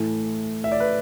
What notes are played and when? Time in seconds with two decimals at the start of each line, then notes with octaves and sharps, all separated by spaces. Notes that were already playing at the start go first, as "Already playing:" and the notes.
Already playing: A2 E3 A3
0.64 E5
0.72 D5
0.80 B4